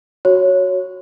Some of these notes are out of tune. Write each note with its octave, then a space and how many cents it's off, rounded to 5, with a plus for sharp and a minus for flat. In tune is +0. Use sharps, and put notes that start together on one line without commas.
F#4 +0 C#5 +0